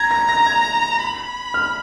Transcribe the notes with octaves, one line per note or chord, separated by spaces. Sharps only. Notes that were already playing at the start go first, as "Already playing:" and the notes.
Already playing: A#5 G#6
A#6
A#6
G#6
B5
F6